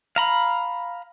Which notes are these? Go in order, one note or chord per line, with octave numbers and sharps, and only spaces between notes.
F5 A#5 B5